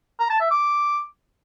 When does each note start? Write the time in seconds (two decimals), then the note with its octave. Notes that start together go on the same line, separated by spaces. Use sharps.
0.20 A#5
0.30 A5
0.40 E5
0.51 D6